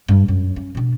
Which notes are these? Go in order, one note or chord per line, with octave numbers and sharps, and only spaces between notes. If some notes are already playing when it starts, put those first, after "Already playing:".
G2
F#2
C#4
B2 D4